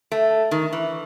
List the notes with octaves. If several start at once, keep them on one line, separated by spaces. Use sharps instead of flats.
A3
D#3
E3